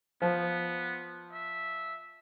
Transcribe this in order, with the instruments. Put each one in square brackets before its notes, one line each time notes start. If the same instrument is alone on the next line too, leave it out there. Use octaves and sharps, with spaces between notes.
[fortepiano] F3 [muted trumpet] B3
[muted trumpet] E5